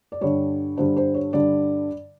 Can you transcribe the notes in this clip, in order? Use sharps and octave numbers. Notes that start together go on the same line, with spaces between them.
D5
G2 D3 G3 C#5
G2 D3 G3 C5
C5
C#5
G2 D3 G3 D5